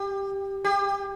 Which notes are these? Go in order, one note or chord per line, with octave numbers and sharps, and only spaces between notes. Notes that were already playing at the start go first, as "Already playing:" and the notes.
Already playing: G4
G4